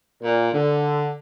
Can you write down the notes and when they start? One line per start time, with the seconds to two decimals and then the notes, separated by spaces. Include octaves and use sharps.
0.22 A#2
0.53 D3